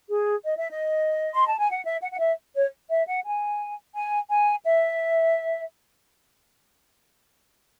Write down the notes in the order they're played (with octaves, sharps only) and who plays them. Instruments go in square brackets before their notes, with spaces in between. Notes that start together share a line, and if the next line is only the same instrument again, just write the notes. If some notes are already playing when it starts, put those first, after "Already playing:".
[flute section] G#4
D#5
E5
D#5
C6
A5
G#5
F#5
E5
F#5
F#5
E5
C#5
E5
F#5
G#5
G#5
G#5
E5